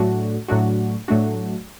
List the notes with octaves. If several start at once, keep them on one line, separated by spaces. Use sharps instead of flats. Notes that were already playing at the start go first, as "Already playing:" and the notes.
Already playing: A2 F#3 A3 D4 F#4
A2 F#3 A3 D4 F#4
A2 F#3 A3 D4 F#4